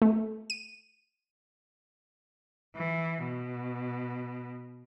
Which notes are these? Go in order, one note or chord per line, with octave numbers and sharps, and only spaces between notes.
A3
D#7
E3
B2